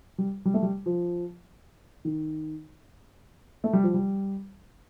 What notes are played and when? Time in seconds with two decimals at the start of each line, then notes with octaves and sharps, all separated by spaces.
0.18 G3
0.45 G3
0.54 A3
0.63 G3
0.86 F3
2.05 D#3
3.64 A3
3.73 G3
3.83 F3
3.94 G3